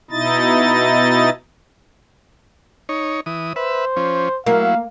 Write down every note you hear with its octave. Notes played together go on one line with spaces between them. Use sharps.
B2 D#4 E4 D#5 A6
D#4 C#5
E3 D#6
B4 C5 E5
F3 C#4
F#3 A#3 E4 F5